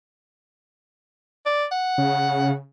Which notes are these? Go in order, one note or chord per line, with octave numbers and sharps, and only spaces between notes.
D5
F#5
C#3